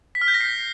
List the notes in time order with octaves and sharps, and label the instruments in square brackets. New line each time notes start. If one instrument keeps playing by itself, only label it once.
[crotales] B6
F6
G6
A#6
C7